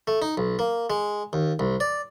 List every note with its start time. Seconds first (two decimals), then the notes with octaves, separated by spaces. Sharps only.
0.07 A3
0.22 D#4
0.37 B1
0.59 A#3
0.90 G#3
1.33 D#2
1.59 C2
1.80 D5